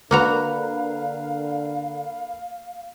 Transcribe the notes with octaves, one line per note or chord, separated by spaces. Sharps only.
D3 A#3 F#4 A#4 B4 F5 A#5